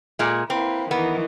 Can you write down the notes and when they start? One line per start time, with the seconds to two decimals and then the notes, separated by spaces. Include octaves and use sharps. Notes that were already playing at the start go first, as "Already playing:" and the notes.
0.19 A#2 G#3
0.50 A#3 C4 E4 B4
0.91 D#3 E3 A#3 B3